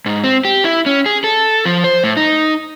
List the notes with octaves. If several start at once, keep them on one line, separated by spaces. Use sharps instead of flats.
G#2
C4
G4
E4
C#4
G#4
A4
F3
C5
A2
D#4